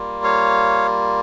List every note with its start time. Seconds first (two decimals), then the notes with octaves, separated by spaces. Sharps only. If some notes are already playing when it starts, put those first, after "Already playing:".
Already playing: G3 A#3 F4
0.24 C#5 F5